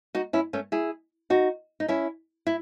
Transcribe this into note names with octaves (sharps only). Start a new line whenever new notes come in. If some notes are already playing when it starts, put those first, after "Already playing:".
D#4 F#4
C#4 E4
A3 C#4
E4 G#4
D#4 F#4
D#4
C#4 E4
E4